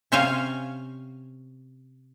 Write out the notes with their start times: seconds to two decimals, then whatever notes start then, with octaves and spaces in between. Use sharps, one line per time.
0.12 C3 C#4 C5 C#5 F5 G#5